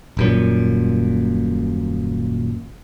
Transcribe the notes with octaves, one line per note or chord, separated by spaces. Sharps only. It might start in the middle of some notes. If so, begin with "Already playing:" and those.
D#1 F#2 A#2